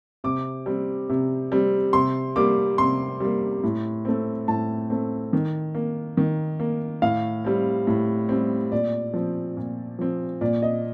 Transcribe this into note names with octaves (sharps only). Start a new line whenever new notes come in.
C3 D6
G3 C4
C3
G3 C4
C3 C6
G3 A#3 D6
C3 C6
G3 A#3
A2
A3 C4
A2 A5
A3 C4
D#3
A#3
D#3
A#3
A2 F5
G3 C4
A2
G3 C4
A#2 D5
F3 C4
A#2
F3 C4
A#2 D5
D#5